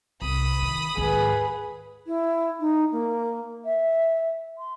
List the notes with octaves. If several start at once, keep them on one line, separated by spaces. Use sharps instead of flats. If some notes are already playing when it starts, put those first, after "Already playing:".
C2 B5 D#6
D#3
D#2 G#2 G#4 B4
E4
D#4
A#3
E5
C6